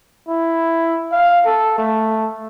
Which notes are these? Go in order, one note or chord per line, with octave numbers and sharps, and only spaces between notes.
E4
F5
A4
A3